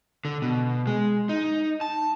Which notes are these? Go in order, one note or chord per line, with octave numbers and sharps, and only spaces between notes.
D3
B2
G#3
D#4
A5